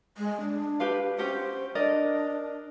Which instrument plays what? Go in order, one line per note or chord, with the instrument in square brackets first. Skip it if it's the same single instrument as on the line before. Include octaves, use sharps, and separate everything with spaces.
[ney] G#3
D4
[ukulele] G4 B4 F5
[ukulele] C#4 G4 F#5 [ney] C5
[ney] D4 [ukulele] A#4 D5 D#5